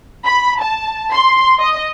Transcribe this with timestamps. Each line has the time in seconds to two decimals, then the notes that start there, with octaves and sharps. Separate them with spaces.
0.25 B5
0.61 A5
1.13 C6
1.59 D#5